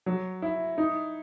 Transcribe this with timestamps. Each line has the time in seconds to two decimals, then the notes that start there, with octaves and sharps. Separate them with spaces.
0.06 F#3
0.42 E4
0.78 D#4